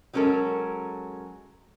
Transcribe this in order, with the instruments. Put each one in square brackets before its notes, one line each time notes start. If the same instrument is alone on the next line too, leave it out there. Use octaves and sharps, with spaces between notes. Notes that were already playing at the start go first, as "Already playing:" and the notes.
[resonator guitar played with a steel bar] F#3 G#3 C#4 A4 A#4